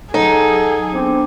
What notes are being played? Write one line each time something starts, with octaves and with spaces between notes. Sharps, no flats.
F#3 D#4 G#4 A4
B3 C4 D4 D6